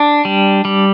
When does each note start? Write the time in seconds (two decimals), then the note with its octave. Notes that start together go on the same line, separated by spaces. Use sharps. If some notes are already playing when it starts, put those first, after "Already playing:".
Already playing: D4
0.25 G3
0.65 G3